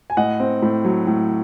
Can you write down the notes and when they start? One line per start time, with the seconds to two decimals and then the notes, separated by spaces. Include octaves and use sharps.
0.10 G#5
0.17 A2 D#5 F#5
0.40 C4
0.62 A2
0.85 F#3
1.07 A2